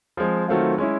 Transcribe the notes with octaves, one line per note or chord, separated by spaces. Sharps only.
F3 G#3 C4
D#3 F#3 A3 C4 F4
G#3 C#4 E4